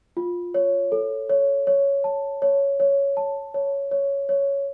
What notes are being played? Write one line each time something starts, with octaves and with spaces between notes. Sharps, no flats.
F4
C#5
A4
C#5
C#5
A5
C#5
C#5
A5
C#5
C#5
C#5